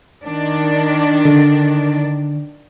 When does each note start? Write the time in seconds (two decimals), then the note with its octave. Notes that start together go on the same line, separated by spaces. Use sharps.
0.23 D#3 D4
1.25 D3